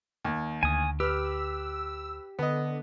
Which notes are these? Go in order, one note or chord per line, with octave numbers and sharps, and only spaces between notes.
D#2
D2 G#5 D#6
G4 B4 E6 F6
D3 B3 D#5